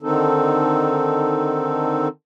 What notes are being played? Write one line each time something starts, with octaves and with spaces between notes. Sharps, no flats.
D3 D#3 C4 D#4 A4